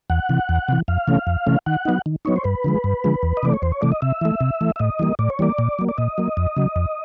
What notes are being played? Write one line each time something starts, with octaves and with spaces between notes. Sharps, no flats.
E2 F#5
C3 E3
E2
C3 E3
F2 F5
C3 E3 A3 C#4
F2
C3 E3 A3 C#4
D#3 F#5
F#3 B3 D#4
D#3
F#3 B3 D#4 C#5
C5
G2 B4
D3 F3 G#3
G2
D3 F3 G#3
E2
D#5
C3 E3 A3 D5
C#5
E2 C5
C#5
C3 E3 A3 D5
D#5
C3 E5
E3 A3
C3
E3 A3
E5
A2 D#5
E3 G3 A#3
A2 D5
C#5
E3 G3 A#3 D5
A#2
F#3 A#3
D5
A#2 D#5
F#3 A#3
F2
C#3 F#3
F2